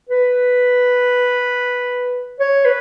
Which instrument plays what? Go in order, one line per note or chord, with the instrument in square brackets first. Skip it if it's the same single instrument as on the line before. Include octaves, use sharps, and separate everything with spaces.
[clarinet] B4
C#5
B4